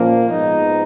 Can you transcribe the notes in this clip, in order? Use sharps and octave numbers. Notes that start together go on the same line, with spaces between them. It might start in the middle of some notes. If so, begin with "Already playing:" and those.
Already playing: A#2 F3 A#3 C#4
G#2 F3 B3 D#4